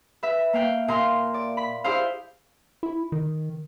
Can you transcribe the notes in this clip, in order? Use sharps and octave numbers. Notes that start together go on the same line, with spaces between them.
B4 E5
A#3 F5 G5 F#6
A#2 F5 A#5 C6
D5
B5
E4 G4 G#4 C5 F5
E4
D#3